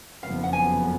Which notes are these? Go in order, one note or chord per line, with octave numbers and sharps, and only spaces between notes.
F#1 F2 F3 B3 F5
F#5
G#5